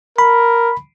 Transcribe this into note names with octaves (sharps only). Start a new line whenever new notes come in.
A#4 B5